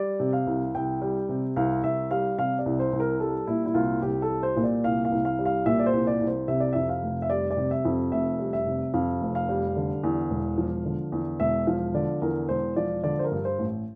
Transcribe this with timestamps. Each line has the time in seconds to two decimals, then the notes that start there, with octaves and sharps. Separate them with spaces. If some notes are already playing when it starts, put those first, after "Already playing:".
Already playing: G3 D5
0.20 C3
0.33 F5
0.47 C2
0.75 C2 G5
1.02 G3
1.29 C3
1.56 C2 F5
1.83 C2 E5
2.11 G3 F5
2.38 C3 F5
2.59 D5
2.66 C2
2.79 C5
2.93 C2
3.00 A#4
3.20 G3 A4
3.47 A#2 E4
3.66 E4
3.74 C2 F4
4.02 C2 G4
4.22 A4
4.30 G3
4.43 C5
4.56 A#2
4.64 D5
4.84 C2 F5
5.05 F5
5.12 C2
5.25 F5
5.39 G3
5.45 F5
5.66 A#2 E5
5.79 D5
5.86 C5
5.93 C2
6.07 D5
6.21 C2
6.27 C5
6.48 C3 E5
6.60 D5
6.73 F2 E5
6.89 F5
7.03 F1
7.22 E5
7.30 G3 D5
7.51 D5
7.57 C3
7.71 E5
7.85 F2
8.12 F1 E5
8.40 G3
8.53 E5
8.66 C3
8.94 F2 F5
9.21 F1
9.35 F5
9.49 G3
9.76 D3
10.03 E2
10.30 E1
10.58 F3
10.85 D3
11.12 E2
11.40 E1 E5
11.67 F3 F5
11.94 D3 D5
12.22 E2 A#4
12.49 E1 C5
12.76 F3 D5
13.04 D3 D5
13.19 C5
13.24 A#4
13.31 G2
13.45 C5
13.58 A1